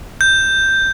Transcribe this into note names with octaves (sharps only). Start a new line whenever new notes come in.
G6